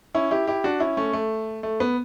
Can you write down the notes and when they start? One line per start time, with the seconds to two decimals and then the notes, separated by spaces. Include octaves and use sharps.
0.15 C#4 E4
0.31 E4 G4
0.47 E4 G4
0.64 D4 F#4
0.80 C#4 E4
0.97 A3 C#4
1.13 A3
1.63 A3
1.80 B3